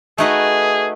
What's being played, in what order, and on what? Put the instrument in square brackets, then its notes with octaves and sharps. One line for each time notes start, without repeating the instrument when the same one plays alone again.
[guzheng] A3 D#4 F#4 B4 [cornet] G#4